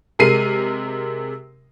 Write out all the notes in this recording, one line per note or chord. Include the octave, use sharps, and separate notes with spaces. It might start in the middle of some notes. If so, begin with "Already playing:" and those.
C3 G#3 A#4 C7 D#7